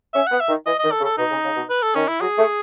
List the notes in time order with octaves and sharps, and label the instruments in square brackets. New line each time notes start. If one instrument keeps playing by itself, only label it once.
[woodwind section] C#4 [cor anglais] E5
[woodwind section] B3 [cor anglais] F#5
[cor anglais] E5
[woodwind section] D#3
[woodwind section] E3 [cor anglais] D#5
[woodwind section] D#3 [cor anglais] D#5
[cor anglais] A4
[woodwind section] C#3
[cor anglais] A4
[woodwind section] B2 [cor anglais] D#4
[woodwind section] C#3
C#3
B2
[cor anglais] B4
A4
[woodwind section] D#3 [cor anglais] C#4
[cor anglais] E4
[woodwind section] F#3 [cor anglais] G#4
[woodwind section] A3